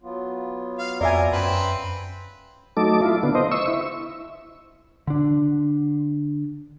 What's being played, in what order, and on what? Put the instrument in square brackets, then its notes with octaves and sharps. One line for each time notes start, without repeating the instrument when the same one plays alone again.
[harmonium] F#3 B3 F4
[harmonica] F5
[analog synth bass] F2 [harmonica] A#4 [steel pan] D5 E5 G#5
[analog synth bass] F#2 [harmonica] C4 B4
[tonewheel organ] F#3 A3 D#4 A4 D6
E4 F4
D3 B3
C5 D#5
C#6 E6
E4
[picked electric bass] D3 D4